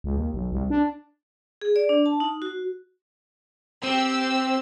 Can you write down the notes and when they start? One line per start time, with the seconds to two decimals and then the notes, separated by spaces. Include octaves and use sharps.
0.04 C#2
0.17 D#2
0.34 B1
0.52 C2
0.70 D4
1.62 G#4
1.76 D5
1.89 D4
2.06 A5
2.20 D#4
2.42 F#4
3.83 C4 G4 E6